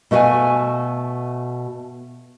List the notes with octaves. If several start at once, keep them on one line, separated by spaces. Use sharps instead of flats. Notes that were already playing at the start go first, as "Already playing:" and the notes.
B2 A3 F#4 E5 F5 G#5